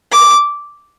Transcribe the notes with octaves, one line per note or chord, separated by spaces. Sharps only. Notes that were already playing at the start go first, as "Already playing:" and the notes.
D6